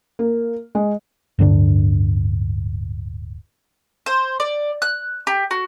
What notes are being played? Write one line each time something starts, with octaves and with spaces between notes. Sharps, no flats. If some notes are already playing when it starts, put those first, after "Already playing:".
A#3
G#3
D1 G2 D3 D4
C5
D5
F#6
G4
F#4